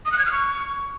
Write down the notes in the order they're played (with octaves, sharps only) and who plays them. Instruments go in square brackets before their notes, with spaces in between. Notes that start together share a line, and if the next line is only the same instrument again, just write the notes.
[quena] D#6
F#6
G#6
F6
C#6